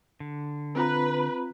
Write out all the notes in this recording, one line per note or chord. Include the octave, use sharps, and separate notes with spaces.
D3
C4 F4 B4 A#5